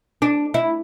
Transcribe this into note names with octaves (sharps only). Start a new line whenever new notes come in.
D4
E4